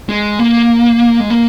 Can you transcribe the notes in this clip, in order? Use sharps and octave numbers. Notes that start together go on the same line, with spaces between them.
G#3
A#3
G#3
A#3